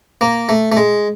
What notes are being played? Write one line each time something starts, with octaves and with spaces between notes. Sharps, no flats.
A#3
A3
A3
G#3